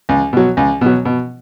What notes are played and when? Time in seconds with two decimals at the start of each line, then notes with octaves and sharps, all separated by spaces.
0.09 C#2
0.33 B2 F#3
0.57 C#2
0.81 B2 F#3
1.05 B2